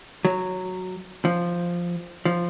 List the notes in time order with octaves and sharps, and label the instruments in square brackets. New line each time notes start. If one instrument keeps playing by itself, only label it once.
[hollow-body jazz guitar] F#3
F3
F3